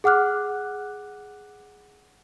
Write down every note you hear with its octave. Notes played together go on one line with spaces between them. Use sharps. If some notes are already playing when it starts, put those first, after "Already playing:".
G#4 F#5 D6 F6 F#6